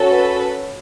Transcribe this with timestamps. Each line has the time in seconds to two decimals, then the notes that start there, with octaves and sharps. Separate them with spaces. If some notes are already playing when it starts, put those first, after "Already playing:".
Already playing: C#4 F#4 A4
0.11 B4